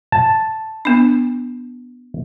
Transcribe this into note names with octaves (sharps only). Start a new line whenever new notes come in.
A5
B3 D4